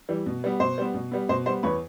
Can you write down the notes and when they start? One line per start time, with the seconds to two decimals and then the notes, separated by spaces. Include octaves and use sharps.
0.09 E3 G3
0.26 B2
0.44 G3 B3
0.60 B2 C5
0.78 G3 B3
0.94 B2
1.11 G3 B3
1.29 B2 C5
1.46 G3 C5
1.49 B3
1.63 E2 B4 C#5